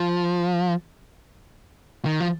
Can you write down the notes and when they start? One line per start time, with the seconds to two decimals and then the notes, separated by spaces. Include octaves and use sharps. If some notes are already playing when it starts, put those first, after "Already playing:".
Already playing: F3
2.05 D#3
2.20 F3